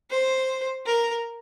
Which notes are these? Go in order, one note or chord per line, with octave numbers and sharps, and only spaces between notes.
C5
A#4